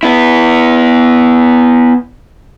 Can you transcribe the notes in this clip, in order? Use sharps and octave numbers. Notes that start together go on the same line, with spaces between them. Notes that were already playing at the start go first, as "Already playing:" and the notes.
B3 E4